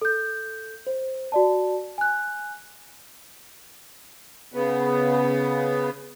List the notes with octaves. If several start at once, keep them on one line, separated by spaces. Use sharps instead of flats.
A4 G6
C5
F#4 D5 A5
G#5 F#6
C#3 B3